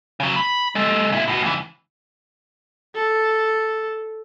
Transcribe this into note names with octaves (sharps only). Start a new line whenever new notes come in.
C#3 F#3
B5
G#3 A4
A#2 E4
A2 F#4
C#2 E3
A4